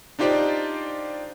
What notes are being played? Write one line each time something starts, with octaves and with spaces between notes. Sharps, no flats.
D4 D#4 F4 G4 C5 D5